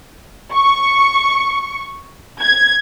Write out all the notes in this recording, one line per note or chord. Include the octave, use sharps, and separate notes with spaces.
C#6
G#6